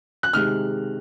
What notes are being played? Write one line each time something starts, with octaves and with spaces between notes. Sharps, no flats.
F#6
C3 D#3 G#3 F6